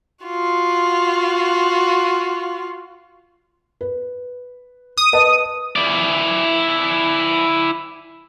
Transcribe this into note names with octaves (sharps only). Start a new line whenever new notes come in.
F4 F#4
B4
D#6
B4 D#5 A5
E4 D5